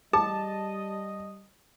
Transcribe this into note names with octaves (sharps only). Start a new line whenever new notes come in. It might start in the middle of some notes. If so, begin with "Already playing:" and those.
G3 G#4 D#5 A5